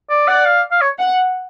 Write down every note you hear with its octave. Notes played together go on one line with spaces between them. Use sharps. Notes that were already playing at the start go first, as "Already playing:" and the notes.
D5
D5 F#5
F5
F5
C#5
F#5